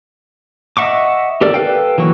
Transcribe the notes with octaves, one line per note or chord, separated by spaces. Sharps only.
D#5 E5 F#5 C#6 D6
G4 A4 A#4 D5
A4 B4 F5 G5
E3 F#3 A#3 C#6